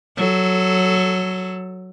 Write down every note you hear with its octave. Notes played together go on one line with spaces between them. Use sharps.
F#3 A4